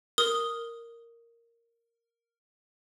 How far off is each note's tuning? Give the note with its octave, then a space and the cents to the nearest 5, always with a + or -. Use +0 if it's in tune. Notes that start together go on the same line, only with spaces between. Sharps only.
A#4 -5 D#6 +0